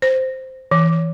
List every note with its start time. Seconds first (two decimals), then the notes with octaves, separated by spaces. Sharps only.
0.02 C5
0.71 E3